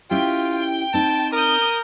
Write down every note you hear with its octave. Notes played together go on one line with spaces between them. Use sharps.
C#4 E4 F4 G4 G5
C4 D#4 A5
A#4 D#6 G6